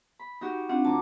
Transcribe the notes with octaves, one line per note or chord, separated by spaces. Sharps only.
B5
D#4 F#4 G4
C4 D4 F4 F#5
D2 A5 A#5 D6